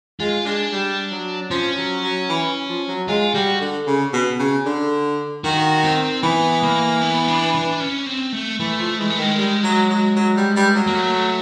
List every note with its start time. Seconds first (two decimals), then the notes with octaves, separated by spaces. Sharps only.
0.20 G#3 F4
0.45 G#3 D4
0.73 G3
1.11 F#3
1.51 F3 C#4
1.77 F#3
2.03 F#3
2.30 E3
2.69 F3
2.88 F#3
3.08 G#3 F4
3.34 G3 F#4
3.61 D3
3.87 C#3
4.13 B2
4.39 C#3
4.66 D3
5.44 D#3 F#4
5.84 C4
6.23 E3 B3
6.63 A#3
7.01 B3
7.28 D4
7.54 D4
7.80 C#4
8.06 C4
8.33 A3
8.59 E3 A3
8.78 F3
8.98 E3 G#3
9.10 A3
9.18 D#3 G#3
9.38 G3
9.64 F#3
9.90 F#3
10.16 F#3
10.37 G3
10.56 G3
10.75 F#3
10.87 A#3
10.95 A3